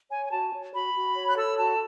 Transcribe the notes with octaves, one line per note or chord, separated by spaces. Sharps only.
C#5 G#5
G#5
F#4 A5
C#5
F#4 B5
F#4
C#5
F#6
A4 E6
F#4 A5